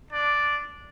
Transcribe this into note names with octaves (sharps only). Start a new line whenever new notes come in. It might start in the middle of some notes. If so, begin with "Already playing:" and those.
D4 D5